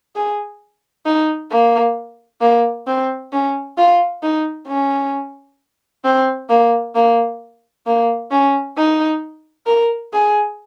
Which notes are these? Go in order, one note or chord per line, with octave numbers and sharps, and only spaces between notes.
G#4
D#4
A#3
A#3
C4
C#4
F4
D#4
C#4
C4
A#3
A#3
A#3
C#4
D#4
A#4
G#4